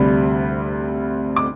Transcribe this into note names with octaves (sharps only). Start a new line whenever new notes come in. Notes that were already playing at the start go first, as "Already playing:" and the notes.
Already playing: D2 C3 G3 B5
D6